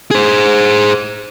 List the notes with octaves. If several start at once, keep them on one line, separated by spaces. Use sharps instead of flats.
G#4 C5